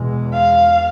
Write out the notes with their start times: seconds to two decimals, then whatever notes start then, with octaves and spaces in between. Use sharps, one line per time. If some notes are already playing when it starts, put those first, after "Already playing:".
Already playing: E2 B2 G#3
0.34 F5